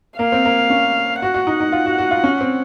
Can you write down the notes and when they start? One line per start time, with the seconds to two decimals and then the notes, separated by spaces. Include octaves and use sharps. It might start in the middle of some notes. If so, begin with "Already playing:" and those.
0.19 A#3 F5
0.32 C4
0.45 A#3
0.70 C#4
1.22 F#4 F#5
1.34 F#4
1.47 D#4
1.60 D#4
1.72 F4
1.86 F#4
1.98 F#4
2.11 F4
2.24 C#4
2.41 C4